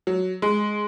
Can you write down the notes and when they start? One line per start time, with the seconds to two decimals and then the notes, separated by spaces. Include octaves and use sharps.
0.07 F#3
0.42 G#3